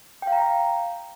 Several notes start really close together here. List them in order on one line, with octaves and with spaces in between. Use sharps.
G5 F5 A#5